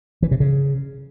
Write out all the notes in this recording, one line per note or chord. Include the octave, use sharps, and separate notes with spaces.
E3
C3
C#3